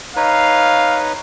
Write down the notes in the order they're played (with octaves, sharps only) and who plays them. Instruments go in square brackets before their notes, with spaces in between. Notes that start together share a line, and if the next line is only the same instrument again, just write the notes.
[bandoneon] D#4 B4 C#5 [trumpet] F5